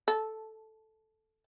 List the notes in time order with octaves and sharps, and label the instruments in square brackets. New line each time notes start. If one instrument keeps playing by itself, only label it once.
[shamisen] A4